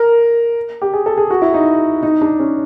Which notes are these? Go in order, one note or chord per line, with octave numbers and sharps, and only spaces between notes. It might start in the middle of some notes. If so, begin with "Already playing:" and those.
Already playing: A#4
G4
G#4
A4
G#4
F#4
E4
D#4
D#4
D4
C#4